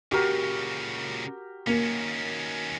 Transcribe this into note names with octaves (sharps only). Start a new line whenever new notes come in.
A#2 C#3 F#4 G4 A#4
D#3 A#3 C#4